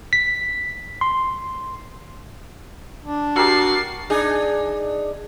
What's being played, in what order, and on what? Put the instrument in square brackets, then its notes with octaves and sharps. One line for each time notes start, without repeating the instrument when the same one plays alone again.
[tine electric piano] B6
C6
[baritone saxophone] D4
[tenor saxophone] F#4 [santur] G4 A#4 E6 [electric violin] A6 C7
[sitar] D4 D#4 G#4